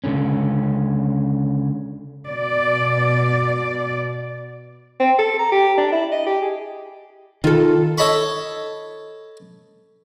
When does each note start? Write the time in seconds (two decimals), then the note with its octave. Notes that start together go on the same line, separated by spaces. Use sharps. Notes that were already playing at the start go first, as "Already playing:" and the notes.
0.04 C#2 G#2 D3 C#4
2.28 B2 D5
5.00 C4
5.19 A4
5.39 A#5
5.52 G4
5.78 D4
5.92 E4
6.12 D#5
6.26 G4
6.42 G#4
7.44 D#3 F4 A4
7.98 A4 C#5 D#5 A5 B5 C#6